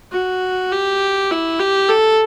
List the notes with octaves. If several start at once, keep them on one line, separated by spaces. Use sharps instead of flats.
F#4
G4
E4
G4
A4